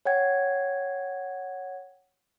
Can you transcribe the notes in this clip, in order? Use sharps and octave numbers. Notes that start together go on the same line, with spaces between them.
C#5 F#5 G5 G#6